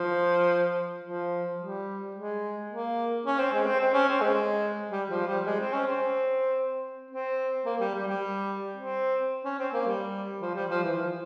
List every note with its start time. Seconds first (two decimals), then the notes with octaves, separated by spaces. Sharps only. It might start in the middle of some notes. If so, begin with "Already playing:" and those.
Already playing: F3
1.05 F3
1.61 G3
2.15 G#3
2.70 A#3
3.26 C#4
3.39 C4
3.53 G#3
3.66 C4
3.81 C4
3.94 C#4
4.09 C4
4.21 G#3
4.91 G3
5.10 F3
5.27 G3
5.46 G#3
5.60 C4
5.73 C#4
5.87 C4
7.11 C4
7.66 A#3
7.81 G3
7.94 G3
8.08 G3
8.77 C4
9.45 C#4
9.59 C4
9.74 A#3
9.87 G3
10.42 F3
10.55 G3
10.70 F3
10.84 E3
10.97 F3